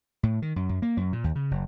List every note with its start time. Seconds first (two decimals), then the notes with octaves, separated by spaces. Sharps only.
0.23 A2
0.42 D#3
0.56 F#2
0.69 F#2
0.82 A#3
0.97 F#2
1.13 A#2
1.24 D#2
1.36 C#3
1.51 F#1